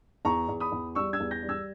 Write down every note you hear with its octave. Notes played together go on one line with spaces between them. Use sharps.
E2 A#5 C#6
E2
B5 D#6
E2
G3 C#6 E6
E6 G#6
E2
G6 A#6
G3
E6 G#6